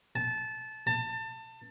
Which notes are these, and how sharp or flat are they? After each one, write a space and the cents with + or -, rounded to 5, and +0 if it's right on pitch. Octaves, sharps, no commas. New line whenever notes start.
A5 -20
A5 +25